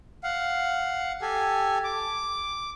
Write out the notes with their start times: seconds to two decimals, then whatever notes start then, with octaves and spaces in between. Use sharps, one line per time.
0.23 F5 F#5
1.22 G4 A4 G#5
1.84 D6